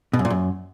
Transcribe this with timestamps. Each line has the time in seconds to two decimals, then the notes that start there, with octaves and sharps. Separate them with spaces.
0.13 B2
0.19 F#2
0.25 A#2
0.30 F#2